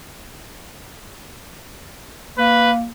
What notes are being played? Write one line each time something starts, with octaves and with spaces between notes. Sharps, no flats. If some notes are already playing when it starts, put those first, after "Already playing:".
A#3 B4